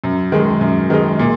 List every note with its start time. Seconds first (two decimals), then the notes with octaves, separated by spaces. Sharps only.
0.04 F#2
0.32 D#3 G#3 D#4
0.61 F#2
0.90 D#3 G#3 D#4
1.19 A#2